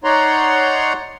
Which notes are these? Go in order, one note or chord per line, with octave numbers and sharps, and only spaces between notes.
D#4 C#5 D5 F#5 A#5 C6